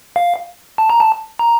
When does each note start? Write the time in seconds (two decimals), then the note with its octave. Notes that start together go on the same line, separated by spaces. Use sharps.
0.16 F5
0.78 A5
0.90 A#5
1.00 A5
1.39 A#5